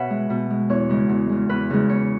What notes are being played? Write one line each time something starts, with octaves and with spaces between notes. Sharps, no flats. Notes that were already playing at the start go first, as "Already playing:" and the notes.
Already playing: B2 B4 C#5 E5 F#5
G#3
B2
G#3
E2 C#5
C#3 G#3
E2
C#3 G#3
E2 B4
C#3 G#3
E2 C#5